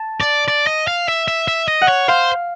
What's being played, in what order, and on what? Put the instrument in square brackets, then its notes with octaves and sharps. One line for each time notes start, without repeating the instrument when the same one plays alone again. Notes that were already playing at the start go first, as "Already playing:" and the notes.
Already playing: [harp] A5
[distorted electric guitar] D5
D5
D#5
F5
E5
E5
E5
D#5
[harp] F#5
[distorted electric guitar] C#5
[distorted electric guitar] C5 [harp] F5